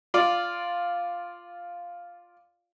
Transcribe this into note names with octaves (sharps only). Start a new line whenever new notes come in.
F4 D5